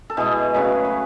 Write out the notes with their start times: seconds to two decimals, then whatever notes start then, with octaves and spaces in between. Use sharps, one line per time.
0.10 A4
0.17 B2 G#3 E4 G#4
0.54 C#3 F#3 A3 G#4 B4
0.84 B4